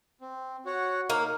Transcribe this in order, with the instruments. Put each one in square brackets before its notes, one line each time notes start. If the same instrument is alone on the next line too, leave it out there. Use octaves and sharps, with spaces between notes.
[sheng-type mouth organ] C4
F#4 C#5 F#5
[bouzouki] A#3 [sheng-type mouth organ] D#4